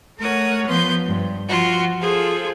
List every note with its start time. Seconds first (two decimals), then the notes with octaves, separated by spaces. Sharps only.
0.18 A3 A#4 C#5 F#5 D#6
0.66 F3 B3 C6 G6
1.06 G2
1.48 F3 F4 F#4
2.01 F4 G#4 A4 C5